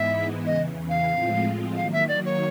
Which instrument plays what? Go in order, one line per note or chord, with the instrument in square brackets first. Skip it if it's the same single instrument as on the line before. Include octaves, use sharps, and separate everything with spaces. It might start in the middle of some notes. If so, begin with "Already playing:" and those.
Already playing: [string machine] G#2 E3 G#3 B3 E4 [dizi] E5
[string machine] E2 C#3 E3 [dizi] D#5
[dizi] F5
[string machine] A2 F3 G#3 C4 F4
[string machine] D#3 F#3 A#3 [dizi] F5
[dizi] E5
D5
C#5